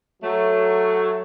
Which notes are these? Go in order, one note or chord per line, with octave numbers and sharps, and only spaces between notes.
F#3 A3